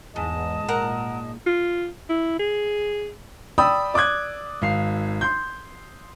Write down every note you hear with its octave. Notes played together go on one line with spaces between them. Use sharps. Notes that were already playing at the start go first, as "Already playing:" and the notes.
E2 G#2 D#5 A5 D#6
A#2 A#4 F#5
F4
E4
G#4
D5 G5 B5 D#6 E6
D5 D6 D#6 F#6 G#6
G#1 F5 C7
C6 G6